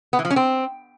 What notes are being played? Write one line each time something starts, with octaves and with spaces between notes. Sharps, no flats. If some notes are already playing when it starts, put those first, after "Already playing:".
B3
E3
F3
C#4
C4